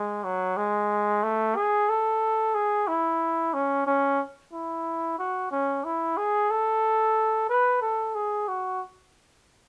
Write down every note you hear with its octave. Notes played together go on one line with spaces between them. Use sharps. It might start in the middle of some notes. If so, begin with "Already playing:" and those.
Already playing: G#3
F#3
G#3
A3
G#4
A4
G#4
E4
C#4
C#4
E4
F#4
C#4
E4
G#4
A4
B4
A4
G#4
F#4